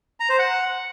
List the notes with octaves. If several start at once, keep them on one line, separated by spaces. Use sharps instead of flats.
A#5
C5
F#5